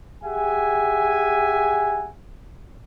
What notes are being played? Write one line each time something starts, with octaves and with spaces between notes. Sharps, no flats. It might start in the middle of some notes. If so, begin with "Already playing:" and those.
G4 G#4 E5 F#5 G#5